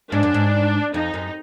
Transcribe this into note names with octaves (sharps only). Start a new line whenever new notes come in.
G#2 D4
F#2
G#2
F2 D#4
F#2